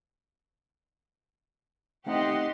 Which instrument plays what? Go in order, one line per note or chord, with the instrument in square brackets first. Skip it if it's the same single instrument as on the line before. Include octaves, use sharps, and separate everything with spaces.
[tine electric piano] A3 C4 D#4 [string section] G4 C6 [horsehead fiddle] D#5 F#5